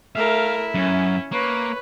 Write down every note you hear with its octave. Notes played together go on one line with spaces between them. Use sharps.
A3 E4 A#4 E5 F5
F#2 C#4
A#3 B4 C#5